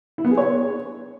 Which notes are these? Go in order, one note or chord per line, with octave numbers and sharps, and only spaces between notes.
E4
B3
G#4
C#5